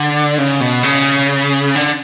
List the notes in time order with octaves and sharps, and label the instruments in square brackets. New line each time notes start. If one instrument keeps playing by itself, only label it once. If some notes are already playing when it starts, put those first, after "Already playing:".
Already playing: [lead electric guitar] D3
C#3
B2
C#3
D3